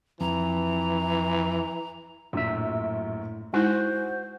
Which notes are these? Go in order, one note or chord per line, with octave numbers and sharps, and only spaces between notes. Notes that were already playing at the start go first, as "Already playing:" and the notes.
F2 E3 A#5
A#1 F#2 A2 E5
G#3 D#4 E4 F#4 C5 G#5 G6